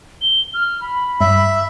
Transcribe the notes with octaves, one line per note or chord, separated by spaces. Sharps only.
G7
F6
B5
G2 E5